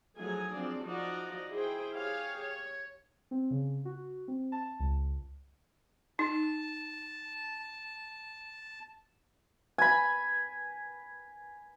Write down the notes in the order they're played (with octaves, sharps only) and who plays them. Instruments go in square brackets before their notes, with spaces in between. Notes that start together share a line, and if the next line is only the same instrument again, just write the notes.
[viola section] F3 F#3 A3 D#4 G#4 G#5
F3 C4 D4 D5
F3 D#4 F#4 D5 D#5
E4 G#4 C5 G5
G4 G#4 C#5 F5
C#5
[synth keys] C4
C#3
F#4
C4
A5
C#2
[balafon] D#4 [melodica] A5
[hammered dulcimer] G#5 B5